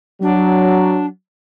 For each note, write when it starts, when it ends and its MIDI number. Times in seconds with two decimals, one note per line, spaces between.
0.22 1.06 54
0.22 1.06 62